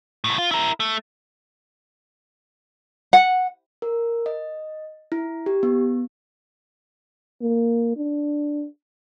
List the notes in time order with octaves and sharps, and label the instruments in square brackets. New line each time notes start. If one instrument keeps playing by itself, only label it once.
[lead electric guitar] C2 A2
F4
E4 A#4
A3
[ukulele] F#5
[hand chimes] A#4
D#5
E4
G4
B3
[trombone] A#3
D4